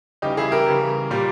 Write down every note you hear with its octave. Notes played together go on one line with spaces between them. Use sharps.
C#3 E3 G3 D#4 G4
E4 G#4
G4 A#4
C#3 E3 G3
A#2 G3